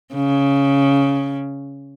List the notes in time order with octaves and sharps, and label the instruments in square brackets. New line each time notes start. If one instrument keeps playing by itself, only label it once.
[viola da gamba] C#3